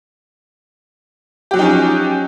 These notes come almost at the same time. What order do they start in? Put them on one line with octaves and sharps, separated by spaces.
G4 F#3 F3 D#4 C#4